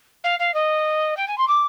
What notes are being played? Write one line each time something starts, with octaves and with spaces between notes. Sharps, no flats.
F5
F5
D#5
G5
G#5
C6
D6